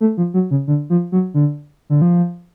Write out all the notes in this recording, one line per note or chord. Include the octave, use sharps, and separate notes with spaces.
A3
F3
F#3
C#3
D3
F3
F#3
D3
D3
F3